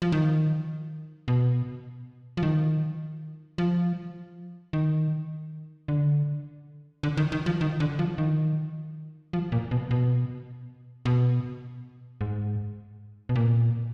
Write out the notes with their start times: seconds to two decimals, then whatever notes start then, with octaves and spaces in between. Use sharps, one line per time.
0.02 F3
0.12 D#3
1.28 B2
2.37 F3
2.43 D#3
3.58 F3
4.73 D#3
5.88 D3
7.03 D3
7.17 D#3
7.32 D#3
7.46 F3
7.61 D#3
7.80 D3
7.99 F3
8.18 D#3
9.33 F3
9.52 A#2
9.71 B2
9.91 B2
11.05 B2
12.21 G#2
13.29 B2
13.36 A#2